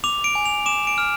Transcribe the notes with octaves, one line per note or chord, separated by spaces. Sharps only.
D6 F7
D7
G#5
F7
D6 E7
D7
F6